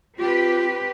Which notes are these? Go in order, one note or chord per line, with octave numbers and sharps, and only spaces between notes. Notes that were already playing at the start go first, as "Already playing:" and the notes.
C4 F4 G4 B4